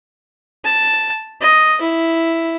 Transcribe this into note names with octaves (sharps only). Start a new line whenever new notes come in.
A5
D#5
E4